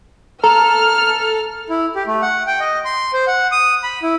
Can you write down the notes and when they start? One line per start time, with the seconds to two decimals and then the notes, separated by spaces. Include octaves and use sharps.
0.44 A4 A#5 F6
1.69 E4
1.96 G4
2.07 A3
2.22 F#5
2.47 G5
2.60 D#5
2.85 C6
3.14 C5
3.27 F#5
3.52 D#6
3.83 B5
4.03 E4